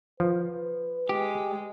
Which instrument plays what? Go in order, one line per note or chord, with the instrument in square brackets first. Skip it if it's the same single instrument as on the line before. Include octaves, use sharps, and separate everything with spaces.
[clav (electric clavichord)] F3 [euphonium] B4
[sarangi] G#3 [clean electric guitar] G4